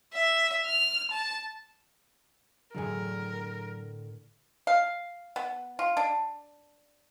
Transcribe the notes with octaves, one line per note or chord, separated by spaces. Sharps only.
E5
F6
A5
A2 D3 F#3 G#4 A#4 G#5
F5
B3
F4
D4